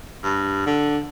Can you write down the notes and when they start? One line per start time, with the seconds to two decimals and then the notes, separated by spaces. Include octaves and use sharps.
0.23 G2
0.67 D3